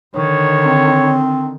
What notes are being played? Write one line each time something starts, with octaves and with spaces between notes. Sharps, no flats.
D3 D#3 C#5
C4